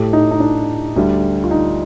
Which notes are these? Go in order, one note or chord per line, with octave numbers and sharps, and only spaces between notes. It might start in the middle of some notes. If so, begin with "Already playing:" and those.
Already playing: A2 A3 G4
D#4
D#4
D4
D2 D3 G3
F4
D#4